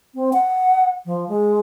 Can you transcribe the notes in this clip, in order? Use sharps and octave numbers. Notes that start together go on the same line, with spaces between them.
C4
F#5
F3
G#3